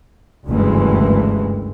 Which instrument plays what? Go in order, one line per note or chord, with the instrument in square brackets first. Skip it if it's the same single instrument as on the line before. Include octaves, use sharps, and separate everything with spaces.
[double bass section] F#1 D2 G2 E3 G#3